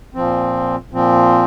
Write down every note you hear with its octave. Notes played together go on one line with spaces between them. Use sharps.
A#2 F3 C4
A#2 F3 C4